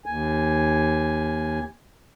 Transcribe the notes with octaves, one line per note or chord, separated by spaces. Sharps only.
D#2 G#5